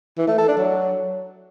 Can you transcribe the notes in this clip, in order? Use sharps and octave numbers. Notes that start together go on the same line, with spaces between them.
E3
A3
A4
D4
F#3